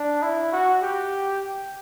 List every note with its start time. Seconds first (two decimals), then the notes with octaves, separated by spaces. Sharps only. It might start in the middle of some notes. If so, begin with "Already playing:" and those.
Already playing: D4
0.22 E4
0.52 F#4
0.82 G4